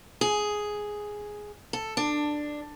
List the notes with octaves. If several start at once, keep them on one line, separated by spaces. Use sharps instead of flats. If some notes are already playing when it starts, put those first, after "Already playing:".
G#4
A4
D4